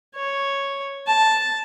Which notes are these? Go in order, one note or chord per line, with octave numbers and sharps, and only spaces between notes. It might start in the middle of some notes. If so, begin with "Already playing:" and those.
C#5
A5